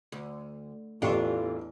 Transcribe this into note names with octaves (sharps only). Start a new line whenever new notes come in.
D2
A1 E2 E3 D4 F4 G4 A4 C#6